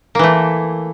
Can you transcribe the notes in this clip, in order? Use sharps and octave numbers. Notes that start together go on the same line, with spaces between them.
E3 A3 A#3